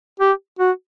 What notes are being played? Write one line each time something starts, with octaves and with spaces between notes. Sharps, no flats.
G4
F#4